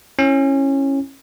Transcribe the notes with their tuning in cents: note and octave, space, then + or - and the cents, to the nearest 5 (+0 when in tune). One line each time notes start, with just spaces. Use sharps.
C#4 -20 E4 +0